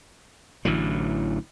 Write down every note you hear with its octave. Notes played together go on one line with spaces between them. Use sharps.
A1 D3 E3 F#3